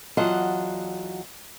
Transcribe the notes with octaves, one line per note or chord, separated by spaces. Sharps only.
E2 F#3 F4 D#5 F#5 A5